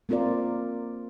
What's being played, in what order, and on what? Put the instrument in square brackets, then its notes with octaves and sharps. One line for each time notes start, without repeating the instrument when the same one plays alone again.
[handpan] A#3 C4 F4 A#4 D5